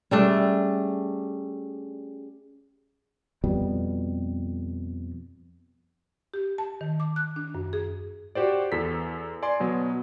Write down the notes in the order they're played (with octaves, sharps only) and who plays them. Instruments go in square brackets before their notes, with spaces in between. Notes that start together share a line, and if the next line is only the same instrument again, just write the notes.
[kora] G3 A3 D4 [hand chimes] C#4 G#4
[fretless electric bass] F2 B2 G3
[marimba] G4
A5
D#3
D6
F#6
D4
F#2
G#4
[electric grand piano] F#4 G4 C5 D5
E2 A4 B6
D5 G#5 C6
B2 F#3 B3